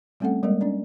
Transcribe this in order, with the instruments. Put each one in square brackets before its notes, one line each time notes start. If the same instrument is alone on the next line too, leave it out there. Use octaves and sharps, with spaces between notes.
[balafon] G3 A3 C4 C#4 A4 F#5
G3 G#3 A#3 A#4 D#5
C#4 D4 D5